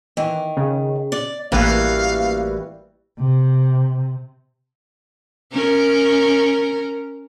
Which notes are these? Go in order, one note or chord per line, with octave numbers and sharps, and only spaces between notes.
D#3 E3
C#3
D5
A1 E3 G3 A#3 F#4 B4 F5
C3
C#4 A#4